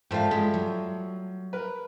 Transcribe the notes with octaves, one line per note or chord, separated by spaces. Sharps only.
G#2 F3 G3 A3 C5 F5 G5
F3 G#3 F4 B5
F#3
A#4 B4